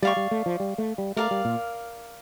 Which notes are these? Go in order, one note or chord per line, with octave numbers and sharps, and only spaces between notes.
G3 D5 F5 C#6
G3
A3
F3
G3
A3
G3
A3 A#4 D5 F5
G3
A#2